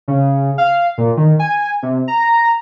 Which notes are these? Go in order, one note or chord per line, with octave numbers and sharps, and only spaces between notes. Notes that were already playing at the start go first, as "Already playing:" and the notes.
C#3
F5
A#2
D#3
G#5
C3
A#5